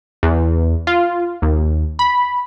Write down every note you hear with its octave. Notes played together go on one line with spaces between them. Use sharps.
E2
F4
D#2
B5